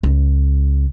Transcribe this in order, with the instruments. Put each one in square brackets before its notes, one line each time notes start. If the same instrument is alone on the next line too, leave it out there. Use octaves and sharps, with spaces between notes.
[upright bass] C#2